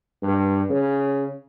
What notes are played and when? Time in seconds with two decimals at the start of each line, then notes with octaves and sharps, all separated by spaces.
0.23 G2
0.70 C#3